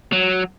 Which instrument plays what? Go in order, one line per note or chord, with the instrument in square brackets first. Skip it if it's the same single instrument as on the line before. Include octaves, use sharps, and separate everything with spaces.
[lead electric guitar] F#3